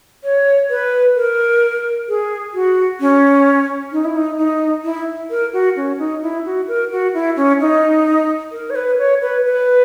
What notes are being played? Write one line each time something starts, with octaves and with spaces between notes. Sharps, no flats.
C#5
B4
A#4
G#4
F#4
C#4
D#4
E4
D#4
D#4
E4
A#4
F#4
C#4
D#4
E4
F#4
A#4
F#4
E4
C#4
D#4
A#4
C#5
B4
C#5
B4
B4